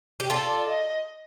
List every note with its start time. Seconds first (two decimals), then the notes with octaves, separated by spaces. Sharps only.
0.20 G4
0.30 F4 A4 D5
0.67 D#5